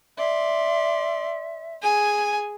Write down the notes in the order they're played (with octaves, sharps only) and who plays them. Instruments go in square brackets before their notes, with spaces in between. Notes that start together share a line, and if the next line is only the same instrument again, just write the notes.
[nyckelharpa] D5 C6 [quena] E5
[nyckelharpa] G#4 [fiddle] G#5